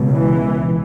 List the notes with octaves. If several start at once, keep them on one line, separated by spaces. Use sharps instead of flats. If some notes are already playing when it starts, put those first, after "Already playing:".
Already playing: C#2 B2
E3